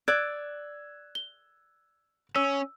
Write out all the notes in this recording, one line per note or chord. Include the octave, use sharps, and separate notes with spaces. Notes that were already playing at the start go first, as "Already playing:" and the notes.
D5 E6 F#6 G#6
G7
C#4 E6